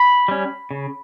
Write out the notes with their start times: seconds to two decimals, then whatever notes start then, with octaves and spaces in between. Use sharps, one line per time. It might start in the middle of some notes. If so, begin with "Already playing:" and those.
Already playing: B5
0.28 G3 C#4
0.71 C#3